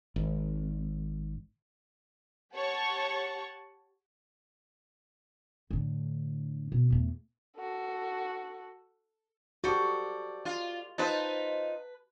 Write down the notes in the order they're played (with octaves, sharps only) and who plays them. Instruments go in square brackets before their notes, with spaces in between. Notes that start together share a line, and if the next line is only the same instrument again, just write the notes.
[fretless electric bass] G#1
[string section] G4 C#5 F#5 A5 C#6
[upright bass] A2 D3
B2
E2 A3
[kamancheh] F#4 A4
[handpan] F#4 G4 [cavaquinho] A4 C5 D5
[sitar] F4
[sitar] D#4 F4 C5 [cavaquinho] B4 A5